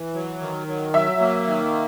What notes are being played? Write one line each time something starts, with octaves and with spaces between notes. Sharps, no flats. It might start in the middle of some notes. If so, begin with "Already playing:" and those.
Already playing: E3
F#3
D#3
F#3
F#3 E5
A#3
D#3